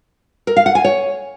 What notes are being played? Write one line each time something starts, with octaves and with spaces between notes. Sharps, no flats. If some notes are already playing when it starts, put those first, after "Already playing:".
A#4
F5
F#5
G#5
C#5